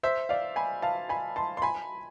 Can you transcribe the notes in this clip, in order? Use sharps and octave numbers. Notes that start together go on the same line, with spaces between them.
C5 E5
D5 F5
G#5 B5
F5 A5
G#5 B5
A5 C6
C6
G#5 B5